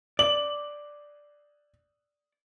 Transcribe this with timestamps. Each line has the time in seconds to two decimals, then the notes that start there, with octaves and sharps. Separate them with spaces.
0.19 D5 F#7